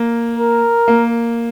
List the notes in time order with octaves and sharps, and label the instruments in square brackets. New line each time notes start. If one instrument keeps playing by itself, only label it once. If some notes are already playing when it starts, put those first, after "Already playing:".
Already playing: [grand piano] A#3
[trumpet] A#4
[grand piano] A#3